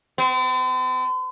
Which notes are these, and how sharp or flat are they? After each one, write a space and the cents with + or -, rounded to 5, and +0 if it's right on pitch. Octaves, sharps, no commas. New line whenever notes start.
C4 -45